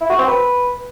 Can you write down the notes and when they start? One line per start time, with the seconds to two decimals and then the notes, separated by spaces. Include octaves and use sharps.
0.01 E4
0.10 F#4
0.19 C4
0.27 B4